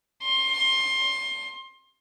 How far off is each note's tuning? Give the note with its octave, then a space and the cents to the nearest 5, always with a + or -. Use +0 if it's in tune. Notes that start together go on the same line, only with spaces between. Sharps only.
C6 +20